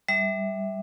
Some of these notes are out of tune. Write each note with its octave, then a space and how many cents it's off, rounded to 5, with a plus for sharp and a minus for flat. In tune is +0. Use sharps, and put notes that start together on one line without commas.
G3 +0 E5 -10